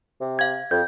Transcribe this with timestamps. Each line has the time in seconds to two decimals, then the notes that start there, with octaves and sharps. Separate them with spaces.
0.21 C3
0.39 F5 G#6
0.71 F2 G6